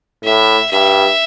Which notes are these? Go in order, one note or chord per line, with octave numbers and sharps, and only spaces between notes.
A2 E5
G2 E5